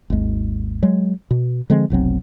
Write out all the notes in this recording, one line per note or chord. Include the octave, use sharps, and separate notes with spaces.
G#1 D#2 G#3
F#3 G#3
B2
D3 F3 G#3 C4
F1 B1 F#3 C4